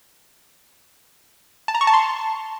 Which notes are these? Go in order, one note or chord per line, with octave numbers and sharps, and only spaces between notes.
A5
A#5
C#6
A5
C6